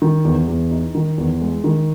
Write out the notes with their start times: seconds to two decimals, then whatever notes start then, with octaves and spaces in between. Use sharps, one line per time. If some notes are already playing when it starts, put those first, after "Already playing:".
0.02 D#3
0.25 E2
0.48 E2
0.71 D#4
0.95 D#3
1.18 E2
1.41 G#3
1.64 D#3